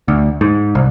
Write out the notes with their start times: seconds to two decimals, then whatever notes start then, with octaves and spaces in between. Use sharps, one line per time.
0.08 D2
0.41 G#2
0.75 C2